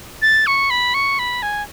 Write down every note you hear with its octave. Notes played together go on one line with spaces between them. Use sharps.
A6
C#6
B5
C#6
B5
G#5